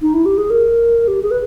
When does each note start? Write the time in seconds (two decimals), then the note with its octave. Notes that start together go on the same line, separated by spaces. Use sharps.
0.02 D#4
0.14 E4
0.25 G4
0.38 G#4
0.50 A#4
1.08 G4
1.23 G#4
1.31 B4